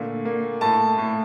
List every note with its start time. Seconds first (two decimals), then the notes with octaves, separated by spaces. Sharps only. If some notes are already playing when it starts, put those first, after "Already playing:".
Already playing: A#2 D3 A3
0.25 A#3
0.61 A2 A5
0.98 A2